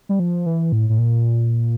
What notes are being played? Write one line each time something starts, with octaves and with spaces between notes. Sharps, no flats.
G3
F3
E3
A2
A2
A#2